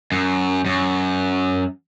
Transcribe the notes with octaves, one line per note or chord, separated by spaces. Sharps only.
F#2
F#2